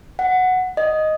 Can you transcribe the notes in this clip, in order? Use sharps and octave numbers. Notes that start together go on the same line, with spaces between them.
F#5
D#5